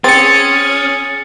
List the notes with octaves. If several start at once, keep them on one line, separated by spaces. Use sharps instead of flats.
C4 C#4 G#4 A6 C#7